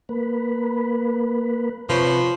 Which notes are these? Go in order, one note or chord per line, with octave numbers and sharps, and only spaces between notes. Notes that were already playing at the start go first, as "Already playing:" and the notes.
A#3 B4
C3 F3 B4 C#5